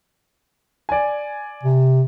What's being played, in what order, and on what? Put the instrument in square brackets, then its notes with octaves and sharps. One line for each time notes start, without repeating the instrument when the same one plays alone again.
[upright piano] D5 G#5
[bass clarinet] C3